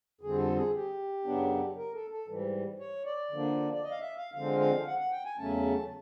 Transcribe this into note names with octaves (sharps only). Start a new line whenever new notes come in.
F2 D3 G3 C4 G#4
A4
G#4
G4
F#2 C#3 F#3 B3 D4
A#4
A4
A4
G#2 E3 G3
C#5
D5
D3 F3 A#3 D4
D5
D#5
F5
E5
F5
D3 F3 G#3 C4 F5
F5
F#5
F#5
G5
G#5
E2 C#3 F#3 A3 C#4 A5